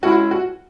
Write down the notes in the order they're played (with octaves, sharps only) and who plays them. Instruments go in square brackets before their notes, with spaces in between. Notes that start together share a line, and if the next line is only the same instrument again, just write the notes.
[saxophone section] G#3 C#4 E4 [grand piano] F#4
[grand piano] F#4